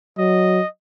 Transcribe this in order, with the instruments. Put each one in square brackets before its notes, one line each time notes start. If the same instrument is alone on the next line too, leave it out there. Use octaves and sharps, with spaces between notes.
[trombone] F#3 [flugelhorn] D#5